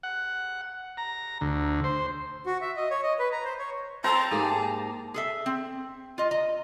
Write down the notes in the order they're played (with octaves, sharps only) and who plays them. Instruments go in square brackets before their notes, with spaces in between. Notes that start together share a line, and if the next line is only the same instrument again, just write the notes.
[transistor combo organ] F#5
A#5
D2
C5
[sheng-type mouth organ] F#4
E5
D#5
C#5
D#5
B4
A#5
C5
C#5
[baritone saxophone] C4 [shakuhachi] A5 [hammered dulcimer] A#5
[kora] G#2 A#3 G4 [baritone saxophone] G#4
[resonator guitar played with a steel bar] G#4 A4 E5
C4
F4 D#5
D#5 A#5